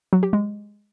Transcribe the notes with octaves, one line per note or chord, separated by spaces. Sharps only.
F#3
G4
G#3